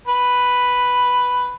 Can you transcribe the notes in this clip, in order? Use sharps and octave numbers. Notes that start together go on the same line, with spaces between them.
B4